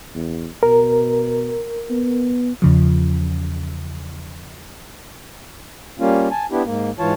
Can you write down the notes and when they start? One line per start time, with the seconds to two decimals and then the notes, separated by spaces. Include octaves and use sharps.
0.15 E2
0.63 B2 A#4
1.90 B3
2.62 E2 C#3 F3
6.00 G3 A#3 C#4 F4
6.31 G#5 A5
6.51 B3 D4 E4 G4
6.65 G#2 A#3
6.99 G#2 E3 F4 C#5 A5